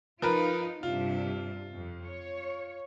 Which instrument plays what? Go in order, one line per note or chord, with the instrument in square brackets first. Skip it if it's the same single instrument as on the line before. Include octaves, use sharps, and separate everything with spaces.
[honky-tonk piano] F3 A#4 B4 [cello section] D#4 F4
[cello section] G2 C3 D4 [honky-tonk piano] F4
[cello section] F2
C#5